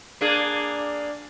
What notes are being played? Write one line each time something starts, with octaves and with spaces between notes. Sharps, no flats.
A#3 D4 G#4